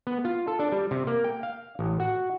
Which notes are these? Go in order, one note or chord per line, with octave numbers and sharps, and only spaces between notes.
B3
F4
A4
D4
G3
C3
A#3
G5
F5
A1
F#4